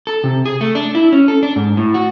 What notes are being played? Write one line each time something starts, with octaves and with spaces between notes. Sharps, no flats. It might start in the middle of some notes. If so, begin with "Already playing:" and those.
A4
C3
G#4
A3
D4
E4
C#4
A4
D4
G#2
A2
F#4